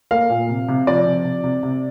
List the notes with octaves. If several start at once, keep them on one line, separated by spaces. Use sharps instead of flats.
A#3 F5
A#2
C3
C3
F3 D5
C3
C3
C3
C3